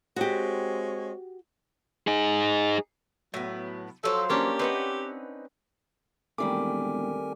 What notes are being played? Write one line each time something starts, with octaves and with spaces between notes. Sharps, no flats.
G#3 C4 F#4 G4 C#5
D#4 G#4
A2 F#3 B3
F3 F#3 A4 C5
A#3 C#4 D4 G4
C4 D#4 B4 F#5
E1 D#3 G3 A3 C4 A#4 G#5 D6